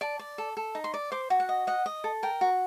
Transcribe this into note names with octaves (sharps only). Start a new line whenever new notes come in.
D5 A5
D5
A4
A4
D#4
C6
D5
C5 D6
F#4
F#5
D#5
D#5 F#5
D#5
A4
A#4 G5
F#4